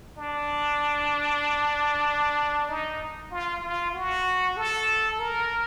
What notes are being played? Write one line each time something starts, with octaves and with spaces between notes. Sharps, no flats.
D4
D#4
F4
F4
F#4
A4
A#4